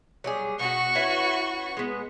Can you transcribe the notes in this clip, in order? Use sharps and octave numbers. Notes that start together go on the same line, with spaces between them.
F#3 G3 G#4
B2 F#4 C#6
C#4 E4 B4
G#3 B3